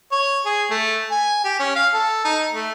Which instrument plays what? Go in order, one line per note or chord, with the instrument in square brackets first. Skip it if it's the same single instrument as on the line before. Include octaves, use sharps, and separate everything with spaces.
[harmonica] C#5
G#4
A3
G#5
G4
C#4
F5
A4
D#4
A3